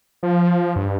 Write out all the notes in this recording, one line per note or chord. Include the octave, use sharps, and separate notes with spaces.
F3
G2